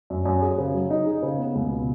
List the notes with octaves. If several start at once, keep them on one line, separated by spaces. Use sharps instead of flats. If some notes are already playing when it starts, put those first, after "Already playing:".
F#2
F#2
G#4
C#3
F#3
D#4
G#4
C#3
B3
C#2
B2